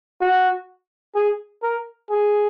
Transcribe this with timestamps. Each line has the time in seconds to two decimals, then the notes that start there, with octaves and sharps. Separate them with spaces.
0.21 F#4
1.15 G#4
1.63 A#4
2.10 G#4